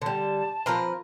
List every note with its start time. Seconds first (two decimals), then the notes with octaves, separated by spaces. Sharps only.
0.02 D3 G3 A5
0.66 F3 C4 F4 A#4 B4